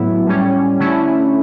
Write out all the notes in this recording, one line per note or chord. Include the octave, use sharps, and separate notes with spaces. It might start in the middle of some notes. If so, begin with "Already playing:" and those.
Already playing: A2 F#3 B3 E4
A2 G3 C#4
D3 A3 C#4 E4